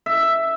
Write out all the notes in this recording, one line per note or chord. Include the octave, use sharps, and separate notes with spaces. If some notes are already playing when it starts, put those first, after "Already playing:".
E5